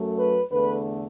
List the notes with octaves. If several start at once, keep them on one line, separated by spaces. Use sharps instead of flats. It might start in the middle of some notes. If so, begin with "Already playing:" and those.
Already playing: F#2 F#3 A3
B4
E2 D3 A3 B4